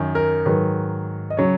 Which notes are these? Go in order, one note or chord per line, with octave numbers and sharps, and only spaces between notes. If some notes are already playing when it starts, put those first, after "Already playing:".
Already playing: F#2 D#3 F#3
A#4
G#2 D#3 F#3 B4
D#5
C#3 F#3 C#5